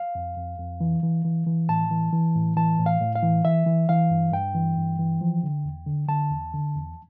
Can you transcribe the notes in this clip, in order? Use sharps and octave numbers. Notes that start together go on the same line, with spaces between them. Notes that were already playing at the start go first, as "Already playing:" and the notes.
Already playing: F5
F2
F2
F2
E3
E3
E3
E3
A2 A5
E3
E3
A2
E3 A5
A2
F5
A2
F5
E3
E3 E5
E3
E3 F5
G2
G2 G5
E3
G2
E3
F3
D3
E2
D3
D3 A5
E2
D3
E2